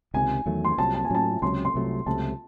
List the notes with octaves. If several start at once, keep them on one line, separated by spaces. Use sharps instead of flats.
C#2 C3 D#3 G#5
E2 D#3 F#3 A3
C6
C2 C3 F#3 A5
A5
G#5
A2 F#3 C#4 A5
C#2 C3 F#3 C#4 C6
C6
C2 C3 F#3 A3
C#2 C3 F#3 A3 A5